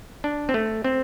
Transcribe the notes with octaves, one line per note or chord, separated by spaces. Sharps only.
D4
C4
A3
C4